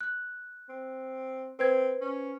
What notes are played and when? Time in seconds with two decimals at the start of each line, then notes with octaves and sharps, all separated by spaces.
0.01 F#6
0.69 C4
1.59 C4 B4 C5 G#6
2.01 C#4